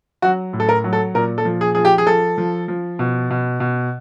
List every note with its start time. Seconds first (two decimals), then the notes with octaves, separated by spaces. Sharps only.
0.22 F#3 F#4
0.53 A2
0.60 A4
0.69 A#4
0.84 F#3
0.93 A4
1.15 A#2 A#4
1.38 A4
1.45 F3
1.61 G#4
1.75 F3 G#4
1.85 G4
1.98 G#4
2.07 F3 A4
2.38 F3
2.68 F3
2.99 B2
3.30 B2
3.60 B2